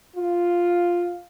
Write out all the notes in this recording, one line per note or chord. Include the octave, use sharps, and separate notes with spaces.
F4